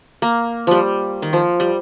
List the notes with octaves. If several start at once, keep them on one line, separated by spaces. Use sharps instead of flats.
A#3
F3 G3
D#3
F3
G3